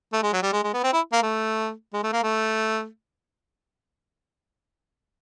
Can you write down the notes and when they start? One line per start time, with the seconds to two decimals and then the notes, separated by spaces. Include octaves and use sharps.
0.12 A3
0.23 G#3
0.33 F#3
0.43 G3
0.53 G#3
0.63 G#3
0.73 B3
0.83 C4
0.93 E4
1.12 A#3
1.22 A3
1.93 G#3
2.03 A3
2.12 A#3
2.23 A3